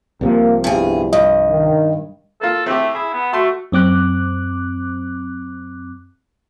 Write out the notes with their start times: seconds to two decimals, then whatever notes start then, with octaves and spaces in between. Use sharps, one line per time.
0.21 C2 C3 F3 A#3
0.64 G2 G3 B3 E4 G#4
1.13 G2 D#5
1.49 D#3
2.41 A#3 F4 A4
2.66 A3 C4 E4 G4
2.95 E4 G#4
3.13 B3
3.33 A3 F#4 A5 C6
3.72 F#2 C4 D6 F#6